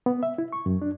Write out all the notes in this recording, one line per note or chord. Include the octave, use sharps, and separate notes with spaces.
B3
E5
E4
C#6
F#2
D4